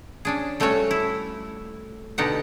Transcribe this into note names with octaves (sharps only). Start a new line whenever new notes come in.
C#4 D4 G#4
G3 A3 C#4 F#4 C#5
E4
B2 D3 D#4 G4 F#5